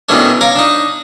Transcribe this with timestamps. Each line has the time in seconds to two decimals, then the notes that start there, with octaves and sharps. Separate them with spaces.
0.09 B2 D#3 E3 A3 C#4 D4
0.41 C#5 F5 A#5 D6
0.56 D4 D#4